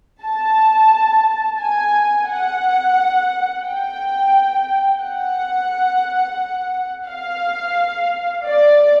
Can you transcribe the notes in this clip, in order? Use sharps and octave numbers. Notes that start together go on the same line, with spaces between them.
A5
G#5
F#5
G5
F#5
F5
D5